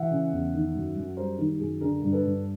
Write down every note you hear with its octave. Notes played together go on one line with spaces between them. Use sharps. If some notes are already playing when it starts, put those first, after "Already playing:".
Already playing: E3 E5 F#5
C#3
E2
D#3
F#2
F#2
G3 A#4 C5
D#3
F#2 G#4
D3 G#4 A#4
G2
A4 B4
G2